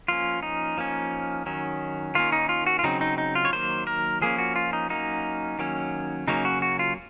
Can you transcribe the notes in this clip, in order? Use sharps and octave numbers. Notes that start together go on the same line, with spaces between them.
F3 A#3 C#4 F4
D#4
F3 A#3 C#4
D#3 F#3 C#4
D#3 A#3 C#4 F4
D#4
F4
F#4
F4
C#3 F#3 C4 D#4
D#4
D#4
F4
C#5
D#3 F#3 A#3 C5
A#4
F3 A#3 C#4 G#4
F#4
F4
D#4
F#3 A#3 C#4 D#4
D#3 F#3 A#3 C#4
C#3 F#3 A#3 C#4 D#4
F#4
F#4
F4